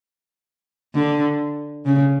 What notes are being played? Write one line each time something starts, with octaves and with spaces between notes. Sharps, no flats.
D3
C#3